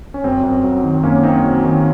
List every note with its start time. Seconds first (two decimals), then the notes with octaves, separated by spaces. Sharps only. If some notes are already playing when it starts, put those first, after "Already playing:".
0.14 C#4
0.24 F#2 C4
0.43 F#2
0.64 F#3
0.84 D#3
1.03 F#2 A#3 C#4
1.23 F#2 C4 D#4
1.44 F#3
1.64 D#3